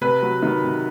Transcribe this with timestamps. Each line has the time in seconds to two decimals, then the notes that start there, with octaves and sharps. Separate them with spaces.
0.01 C3 B4
0.22 F#3
0.43 D#3
0.63 C3